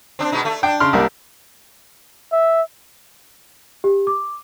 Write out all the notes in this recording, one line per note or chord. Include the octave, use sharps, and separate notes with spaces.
C4 D4
B2 G#3 D#4
A3
D4 G5
C#3 C6 F6
C2 G3 A#3
E5
G4
D6